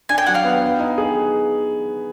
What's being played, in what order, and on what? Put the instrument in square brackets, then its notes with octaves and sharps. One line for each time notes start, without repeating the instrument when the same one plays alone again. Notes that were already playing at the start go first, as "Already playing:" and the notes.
[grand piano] D4 [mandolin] G#5
[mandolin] G5
[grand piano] F#3 [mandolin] F#5
[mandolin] F5 G5
[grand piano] B3
B4
D#4
G#4